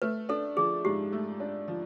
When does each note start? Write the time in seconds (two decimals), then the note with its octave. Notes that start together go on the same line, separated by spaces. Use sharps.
0.02 A3 B4
0.29 D4 A4
0.57 F3 G#4
0.85 G#2 G4
1.12 A3
1.40 D4
1.68 F3